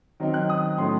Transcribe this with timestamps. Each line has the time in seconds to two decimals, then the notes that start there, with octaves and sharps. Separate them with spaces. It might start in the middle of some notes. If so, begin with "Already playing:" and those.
0.20 D#3 F#3 C4 D#4
0.34 F#6
0.49 D#6
0.78 A2 F#3 A3 C#4 C6